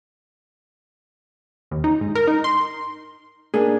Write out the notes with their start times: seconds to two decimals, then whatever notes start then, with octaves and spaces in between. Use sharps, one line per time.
1.71 D#2
1.84 D#4
2.01 G#2
2.15 A#4
2.27 D#4
2.44 C6
3.54 A#3 D4 G#4